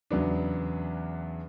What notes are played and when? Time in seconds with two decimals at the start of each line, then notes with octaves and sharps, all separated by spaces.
0.11 E2 C#3 F#3 B3 D4